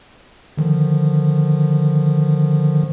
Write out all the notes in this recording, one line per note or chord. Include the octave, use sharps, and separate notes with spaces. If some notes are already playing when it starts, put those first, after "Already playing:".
D3 D#3 F3